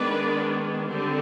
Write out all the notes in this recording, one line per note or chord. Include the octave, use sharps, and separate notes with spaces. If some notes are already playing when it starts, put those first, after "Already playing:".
Already playing: D#3 G#3 B3 D4 B4 D5
D3 G3 C4